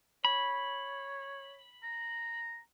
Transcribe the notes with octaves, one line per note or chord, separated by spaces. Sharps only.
C#5 B5
A#5